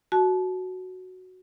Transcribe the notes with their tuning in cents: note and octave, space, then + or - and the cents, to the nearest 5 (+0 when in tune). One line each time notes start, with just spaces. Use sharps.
F#4 +0 A5 -30